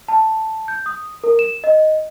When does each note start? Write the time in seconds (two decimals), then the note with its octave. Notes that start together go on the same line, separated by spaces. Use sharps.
0.08 A5
0.68 G6
0.86 D#6
1.24 A#4
1.39 E7
1.64 D#5